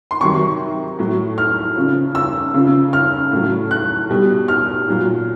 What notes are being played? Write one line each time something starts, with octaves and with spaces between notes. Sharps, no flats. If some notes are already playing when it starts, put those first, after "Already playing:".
C6
C3 D#3 F#3 C#6
A2 F#3
F6
C#3 F3
E6
C#3 F3
F6
A2 F#3
F#6
B2 G3
F6
A#2 F#3